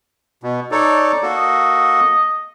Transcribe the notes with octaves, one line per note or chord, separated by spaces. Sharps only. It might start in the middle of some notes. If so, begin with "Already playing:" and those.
B2
D#4 A4 C#5 D5
A#3 F#4 A4
D#5